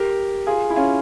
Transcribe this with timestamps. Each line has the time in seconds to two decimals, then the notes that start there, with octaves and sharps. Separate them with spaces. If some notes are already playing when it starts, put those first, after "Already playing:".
Already playing: G4 A#4
0.47 F4 G#4
0.70 E4
0.76 C#4 F4